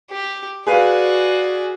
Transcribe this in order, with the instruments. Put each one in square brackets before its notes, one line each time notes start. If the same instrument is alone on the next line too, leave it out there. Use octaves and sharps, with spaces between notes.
[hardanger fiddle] G4
[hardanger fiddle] F#4 D5 [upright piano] G#4 B4 F5